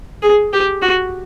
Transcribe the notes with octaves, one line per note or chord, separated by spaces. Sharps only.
G#4
G4
F#4